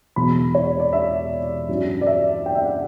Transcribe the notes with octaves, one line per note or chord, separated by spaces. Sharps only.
E1 E2 B2 F#3 B3 B5
C#5
D5
E5
G2 F#3 C#4
D5
E5
G5
E5
F#5